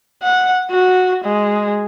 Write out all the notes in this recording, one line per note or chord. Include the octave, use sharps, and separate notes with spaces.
F#5
F#4
G#3